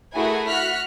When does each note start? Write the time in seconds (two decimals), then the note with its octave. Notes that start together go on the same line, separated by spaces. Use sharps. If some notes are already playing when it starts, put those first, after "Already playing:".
0.14 A3 E4 F#4 G#4 A#4 G#5
0.47 F#4 F6 F#6 B6